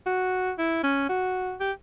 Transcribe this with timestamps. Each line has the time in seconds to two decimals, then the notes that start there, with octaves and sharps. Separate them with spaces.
0.06 F#4
0.58 E4
0.84 C#4
1.09 F#4
1.60 G4